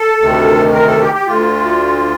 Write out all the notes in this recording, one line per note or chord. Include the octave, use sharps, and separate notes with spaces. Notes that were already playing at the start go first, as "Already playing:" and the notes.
Already playing: A4
D2 C3 D#3
A#4
A4
G4
G4
D2 D3 F4